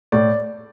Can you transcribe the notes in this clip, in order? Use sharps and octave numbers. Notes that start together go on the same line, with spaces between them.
A2 D5